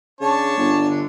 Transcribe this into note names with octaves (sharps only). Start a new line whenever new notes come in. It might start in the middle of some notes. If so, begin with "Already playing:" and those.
C#3 D4 C#5 A5
G1
D3